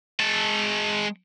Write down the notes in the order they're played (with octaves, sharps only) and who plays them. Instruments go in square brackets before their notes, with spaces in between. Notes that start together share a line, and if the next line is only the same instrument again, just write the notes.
[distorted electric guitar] G#3 A5